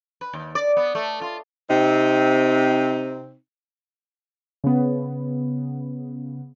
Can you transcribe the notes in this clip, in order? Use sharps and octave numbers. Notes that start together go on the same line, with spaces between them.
B4
D#2
D5
B3
A3
F4
C3 C4 D#4
C#3 B3